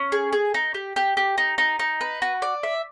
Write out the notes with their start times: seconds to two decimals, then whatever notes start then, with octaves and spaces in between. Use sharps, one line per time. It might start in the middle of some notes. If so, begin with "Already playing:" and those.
Already playing: C#4
0.12 G#4
0.32 G#4
0.54 D#4
0.74 G4
0.96 G4
1.17 G4
1.38 D#4
1.58 D#4
1.79 D#4
2.01 B4
2.22 F#4
2.42 D5
2.63 E5